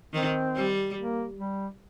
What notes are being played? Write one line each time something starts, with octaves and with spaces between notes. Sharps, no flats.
D#3 C4
G3
A#3
G3